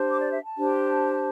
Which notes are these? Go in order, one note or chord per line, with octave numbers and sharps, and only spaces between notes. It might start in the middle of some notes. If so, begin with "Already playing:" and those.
Already playing: D4 G4 C5
D6
D5
E5
A5
D4 G4 C5